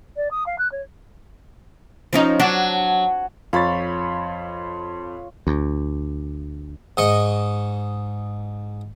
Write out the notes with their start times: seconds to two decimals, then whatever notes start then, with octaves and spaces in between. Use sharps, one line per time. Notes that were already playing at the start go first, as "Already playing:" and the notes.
0.16 D5
0.31 D#6
0.46 F5
0.58 F#6
0.72 C#5
2.13 F3 C#4 D#4
2.40 F#3 D4
3.53 F2 F4 C#5 B5 A6
5.47 D2
6.97 G#2 D#5 C#6